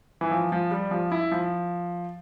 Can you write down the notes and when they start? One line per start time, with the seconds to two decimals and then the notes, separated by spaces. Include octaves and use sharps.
0.21 E3
0.31 F3
0.52 F3
0.71 G3
0.91 F3
1.12 E4
1.32 F3